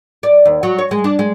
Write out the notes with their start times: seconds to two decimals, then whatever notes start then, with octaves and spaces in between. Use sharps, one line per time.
0.23 D5
0.45 D#2
0.63 F#3
0.79 C#5
0.91 G#3
1.04 D4
1.19 G#3